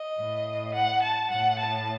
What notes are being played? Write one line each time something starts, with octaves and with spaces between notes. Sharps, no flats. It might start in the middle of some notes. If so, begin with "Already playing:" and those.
Already playing: D#5
A2
F#5
A5
A2 F#5
A5